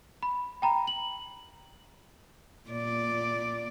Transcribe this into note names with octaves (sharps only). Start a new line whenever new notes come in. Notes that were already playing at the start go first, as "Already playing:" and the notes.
B5
G5 A#5 B5
F#7
A#2 D5